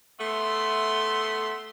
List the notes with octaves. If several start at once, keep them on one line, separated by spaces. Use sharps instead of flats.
A3 B3 E5 C6